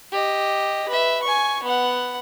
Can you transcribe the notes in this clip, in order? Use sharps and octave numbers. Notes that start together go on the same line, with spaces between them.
G4 D#5
B4 E5
G#5 C#6
B3 F#5